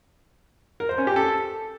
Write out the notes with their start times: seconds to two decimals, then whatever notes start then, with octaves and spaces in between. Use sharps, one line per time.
0.80 A#4
0.89 C5
0.98 C#4
1.07 G4
1.16 A4